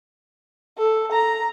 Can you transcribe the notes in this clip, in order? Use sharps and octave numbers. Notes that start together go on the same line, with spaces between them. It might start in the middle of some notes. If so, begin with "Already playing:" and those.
A4
A#5